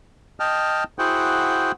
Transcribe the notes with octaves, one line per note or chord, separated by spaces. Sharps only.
D#5 G5 A5 F6
E4 F#4 G#4 C5 F#5 G5